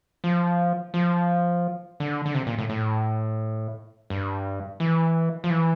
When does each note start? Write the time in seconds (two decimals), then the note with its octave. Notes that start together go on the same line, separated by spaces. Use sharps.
0.24 F3
0.94 F3
2.00 D3
2.26 D3
2.35 C3
2.47 A#2
2.58 A2
2.70 A2
4.10 G2
4.80 E3
5.44 F3
5.50 E3